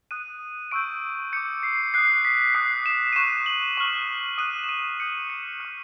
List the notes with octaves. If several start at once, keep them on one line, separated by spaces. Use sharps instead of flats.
D#6 F#6 D#7
C#6 E6 G6 D7
D6 G6 C#7
C7
D#6 F#6 C7
B6
D#6 F#6 C7
E7
D#7
C#6 F#6 E7
F#7
C#6 F6 D#7
D#6 F#6 D#7
E7
D#7
D#6 G6 C#7
C#7
C#6 F6 C#7